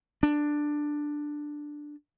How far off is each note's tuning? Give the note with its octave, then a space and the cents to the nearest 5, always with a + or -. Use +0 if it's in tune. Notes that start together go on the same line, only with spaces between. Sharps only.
D4 +10